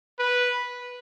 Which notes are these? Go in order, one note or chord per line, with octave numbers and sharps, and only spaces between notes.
B4